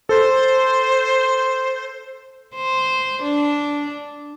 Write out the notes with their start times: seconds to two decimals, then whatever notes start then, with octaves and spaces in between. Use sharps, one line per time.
0.09 A4 C5
2.55 C5
3.22 D4